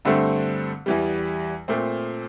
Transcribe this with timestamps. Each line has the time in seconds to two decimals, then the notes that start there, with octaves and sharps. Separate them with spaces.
0.05 G2 D3 A3 C4
0.86 E2 E3 G3
1.68 A#2 A3 C4